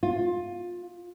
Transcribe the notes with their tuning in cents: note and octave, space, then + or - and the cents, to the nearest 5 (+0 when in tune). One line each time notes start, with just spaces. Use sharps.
F4 +20